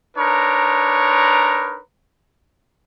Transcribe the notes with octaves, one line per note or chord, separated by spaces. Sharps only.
D4 D#4 A#4 B4 C#5 A#5